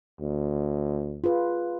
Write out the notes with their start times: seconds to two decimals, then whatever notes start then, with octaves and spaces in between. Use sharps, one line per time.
0.20 D2
1.24 F4 G#4 B4